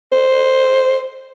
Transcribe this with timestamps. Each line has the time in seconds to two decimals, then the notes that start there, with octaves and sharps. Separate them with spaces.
0.12 C5